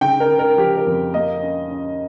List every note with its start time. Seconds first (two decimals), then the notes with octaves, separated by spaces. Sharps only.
0.01 C#3 G5
0.20 A#4
0.29 C#3
0.39 A#4
0.57 F3 G4
0.76 A#4
0.86 F2
1.14 A#3 D#5
1.42 C#4
1.71 C#4